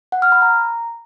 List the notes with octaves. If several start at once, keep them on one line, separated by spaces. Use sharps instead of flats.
F#5
F6
B5
A#5